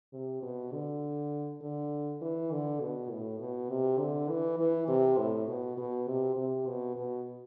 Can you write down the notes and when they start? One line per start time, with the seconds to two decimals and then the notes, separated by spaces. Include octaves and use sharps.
0.13 C3
0.42 B2
0.73 D3
1.61 D3
2.22 E3
2.51 D3
2.80 B2
3.11 A2
3.40 B2
3.70 C3
3.99 D3
4.29 E3
4.59 E3
4.88 C3
5.18 A2
5.48 B2
5.77 B2
6.07 C3
6.36 C3
6.67 B2
6.96 B2